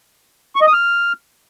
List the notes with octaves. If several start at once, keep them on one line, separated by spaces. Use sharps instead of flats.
C#6
D#5
D#6
F6